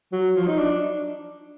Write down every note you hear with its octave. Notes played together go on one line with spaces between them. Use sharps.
F#3
F3
D#4
D4